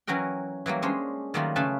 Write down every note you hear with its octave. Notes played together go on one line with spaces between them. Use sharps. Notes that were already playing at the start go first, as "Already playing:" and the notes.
E3 F#3 C#4 F#4 A#4 G5
E3 F#3 G3 A#3
G#3 C#4 D4 C5
D#3 F#3 G3 A3 A#3 F4
C#3 A3 B4 G#5 A5